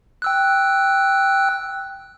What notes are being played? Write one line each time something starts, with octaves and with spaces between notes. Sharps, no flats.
G5 E6 F#6